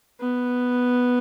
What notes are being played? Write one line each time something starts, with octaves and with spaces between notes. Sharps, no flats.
B3